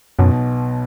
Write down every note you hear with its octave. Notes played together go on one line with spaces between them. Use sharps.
B1 F#2 B2